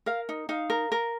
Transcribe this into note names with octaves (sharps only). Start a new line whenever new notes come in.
A#4 F5
D#4
D#4 F5
A#4
A#4